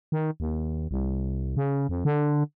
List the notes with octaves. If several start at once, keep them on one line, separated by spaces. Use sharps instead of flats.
D#3
D#2
C2
C#3
F2
D3